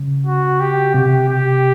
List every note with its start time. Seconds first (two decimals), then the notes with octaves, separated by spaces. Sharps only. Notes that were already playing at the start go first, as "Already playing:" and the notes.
Already playing: C#3
0.26 F#4
0.60 G4
0.94 C3 G4
1.29 G4